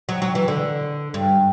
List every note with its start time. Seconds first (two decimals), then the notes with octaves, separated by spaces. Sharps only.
0.09 F#3
0.22 F#3
0.35 E3
0.48 D3
1.14 G2